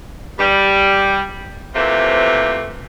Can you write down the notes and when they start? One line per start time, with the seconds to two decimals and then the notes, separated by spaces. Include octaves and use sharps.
0.39 G3
1.75 C3 E3 F3 A3 A#3